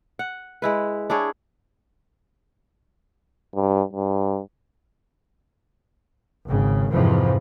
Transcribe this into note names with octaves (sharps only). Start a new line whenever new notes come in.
F#5
G#3 E4 B4
D4 E4 G#4 C#5
G2
G2
G#1 C#3
F2 G#2 C3 E3 F3